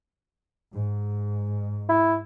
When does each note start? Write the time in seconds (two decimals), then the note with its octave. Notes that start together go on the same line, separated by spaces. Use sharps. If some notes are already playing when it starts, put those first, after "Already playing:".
0.76 G#2
1.89 E4